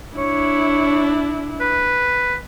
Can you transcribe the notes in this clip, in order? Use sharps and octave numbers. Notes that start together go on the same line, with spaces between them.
D4 E4 C#5
B4